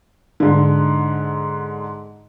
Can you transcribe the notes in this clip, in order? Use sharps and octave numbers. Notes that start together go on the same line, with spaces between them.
G#2 D3